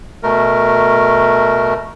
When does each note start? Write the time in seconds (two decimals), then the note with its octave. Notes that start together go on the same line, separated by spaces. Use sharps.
0.23 B2 A3 A#4